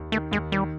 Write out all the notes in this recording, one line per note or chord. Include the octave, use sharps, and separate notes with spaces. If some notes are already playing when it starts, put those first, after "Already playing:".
Already playing: D#2
D#3 A3
D#2 G#3
D#3 G3